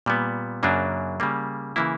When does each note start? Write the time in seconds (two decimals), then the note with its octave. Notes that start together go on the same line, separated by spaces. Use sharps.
0.06 A#2 G3 B3
0.63 F#2 C#3 F#3 A#3 D4
1.20 C#3 G3 A#3
1.76 C#3 E3 A#3 E4